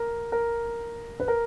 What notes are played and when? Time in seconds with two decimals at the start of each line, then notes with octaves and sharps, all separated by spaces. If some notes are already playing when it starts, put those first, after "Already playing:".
Already playing: A#4
0.32 A#4
1.20 B4
1.28 A#4